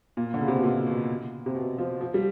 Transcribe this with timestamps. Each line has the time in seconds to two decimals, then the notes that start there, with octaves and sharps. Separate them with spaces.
0.17 A#2
0.34 D3
0.41 C#3
0.48 C3
0.56 B2
0.63 A#2
0.86 B2
1.46 C3
1.55 B2
1.78 F3
2.01 F3
2.14 G3